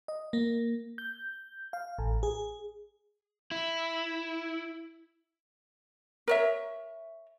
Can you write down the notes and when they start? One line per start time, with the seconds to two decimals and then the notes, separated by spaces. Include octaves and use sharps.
0.08 D#5
0.33 A#3
0.98 G6
1.73 F5
1.99 A1
2.23 G#4
3.51 E4
6.28 A#4 C#5 E5